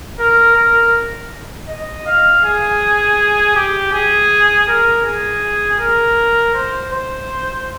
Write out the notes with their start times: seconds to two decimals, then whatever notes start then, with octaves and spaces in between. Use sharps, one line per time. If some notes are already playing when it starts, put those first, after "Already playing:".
0.19 A#4
0.56 A#4
1.68 D#5
2.06 F5
2.44 G#4
3.56 G4
3.93 G#4
4.68 A#4
5.05 G#4
5.80 A#4
6.55 C5
6.93 C5